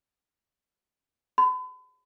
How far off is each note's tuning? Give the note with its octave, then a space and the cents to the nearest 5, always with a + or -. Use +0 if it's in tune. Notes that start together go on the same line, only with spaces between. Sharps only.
B5 +40